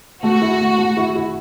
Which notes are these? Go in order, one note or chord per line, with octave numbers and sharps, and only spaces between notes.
A3 F#4
E4
A3
A3
E4
E4